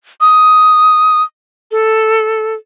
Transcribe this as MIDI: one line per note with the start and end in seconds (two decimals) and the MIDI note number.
0.21 1.23 87
1.71 2.55 69